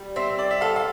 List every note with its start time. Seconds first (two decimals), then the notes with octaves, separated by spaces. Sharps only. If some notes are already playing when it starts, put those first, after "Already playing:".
Already playing: G3
0.16 C4 E5
0.39 D5
0.51 E5
0.61 A4 F5
0.76 F5